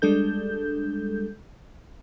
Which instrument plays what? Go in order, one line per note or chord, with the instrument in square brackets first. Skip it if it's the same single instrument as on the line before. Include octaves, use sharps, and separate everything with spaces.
[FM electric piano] G3 G#3 D4 A4 G6